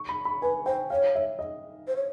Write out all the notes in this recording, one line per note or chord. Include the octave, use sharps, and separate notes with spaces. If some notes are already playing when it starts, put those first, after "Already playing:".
Already playing: C#6
B5
B5
B4 G#5
C5 G5
C#5 F5
E5
D#5
C5
C#5